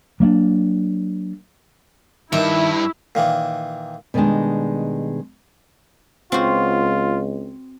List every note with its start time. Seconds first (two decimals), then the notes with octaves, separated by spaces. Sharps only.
0.20 F#3 A#3 C#4 D4
2.33 G2 D#3 E4 E5
3.15 A#2 D#3 E3
4.14 B2 D3 D#3 G3 G#3 D4
6.32 C#2 C4 F4 F#4